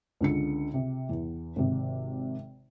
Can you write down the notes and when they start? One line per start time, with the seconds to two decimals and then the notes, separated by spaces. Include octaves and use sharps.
0.21 C#2 D3 C#7
0.74 C3
1.09 E2
1.56 G#1 C3